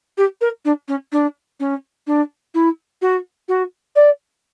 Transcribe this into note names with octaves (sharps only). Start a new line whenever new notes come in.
G4
A#4
D4
C#4
D4
C#4
D4
E4
F#4
F#4
D5